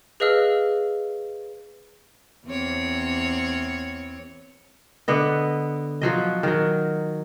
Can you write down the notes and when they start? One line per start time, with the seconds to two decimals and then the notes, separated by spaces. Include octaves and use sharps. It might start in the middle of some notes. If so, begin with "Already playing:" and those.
0.20 G#4 B4 D#5 F5 E6 F6
2.46 E2 C4 C#5
5.08 D3 B3 D#5
6.01 F3 F#3 D#5
6.43 D#3 F#3